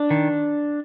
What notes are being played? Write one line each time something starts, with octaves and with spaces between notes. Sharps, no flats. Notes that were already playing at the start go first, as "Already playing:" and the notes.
Already playing: D4
D#3